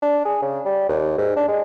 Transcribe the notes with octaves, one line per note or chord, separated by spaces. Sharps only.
D4
G#4
C#3
G3
D#2
G#2
D4
G#3